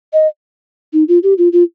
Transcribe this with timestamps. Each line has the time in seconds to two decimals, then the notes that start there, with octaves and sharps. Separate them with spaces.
0.13 D#5
0.93 D#4
1.08 F4
1.23 G4
1.38 F4
1.53 F4